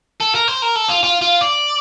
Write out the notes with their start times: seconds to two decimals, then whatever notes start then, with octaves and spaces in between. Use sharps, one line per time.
0.20 A4
0.35 A#4
0.48 C5
0.62 A#4
0.75 A4
0.89 F4
1.04 F4
1.21 F4
1.41 D5